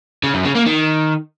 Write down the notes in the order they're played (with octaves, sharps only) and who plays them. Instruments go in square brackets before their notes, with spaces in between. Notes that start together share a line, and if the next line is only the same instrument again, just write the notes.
[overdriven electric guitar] C#3
F#2
C#3
A#3
D#3